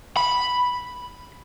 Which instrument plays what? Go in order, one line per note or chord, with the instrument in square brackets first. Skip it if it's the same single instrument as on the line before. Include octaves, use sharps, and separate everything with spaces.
[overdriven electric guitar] B5